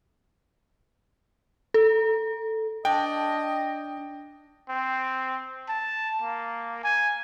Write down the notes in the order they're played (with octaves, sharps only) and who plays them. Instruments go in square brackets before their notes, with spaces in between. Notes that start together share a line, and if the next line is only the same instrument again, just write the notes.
[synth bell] A4
[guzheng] D4 [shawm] D#5 [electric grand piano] G5
[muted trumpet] C4
A5
A#3
G#5